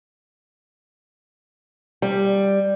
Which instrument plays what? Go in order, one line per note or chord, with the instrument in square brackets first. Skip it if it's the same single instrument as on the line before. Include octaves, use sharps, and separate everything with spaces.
[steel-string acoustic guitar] G3